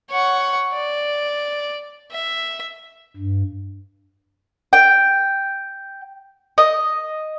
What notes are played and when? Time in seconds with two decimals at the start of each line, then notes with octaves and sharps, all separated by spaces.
0.11 C#5 F#5
0.73 D5
2.12 E5
3.16 G2
4.73 G5
6.58 D#5